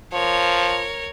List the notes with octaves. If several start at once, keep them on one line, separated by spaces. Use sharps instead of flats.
F3 A#4 C#5